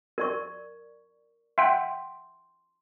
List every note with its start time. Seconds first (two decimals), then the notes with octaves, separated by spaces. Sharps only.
0.18 A#4 D5 C#6
1.58 E5 F#5 G5 C6